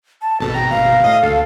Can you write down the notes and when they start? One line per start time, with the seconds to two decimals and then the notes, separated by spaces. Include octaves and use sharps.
0.22 A5
0.40 G#1 B2 A4 A5
0.54 G5 A#5
0.70 F5
1.04 A2 D#5 D#6
1.23 D2 A4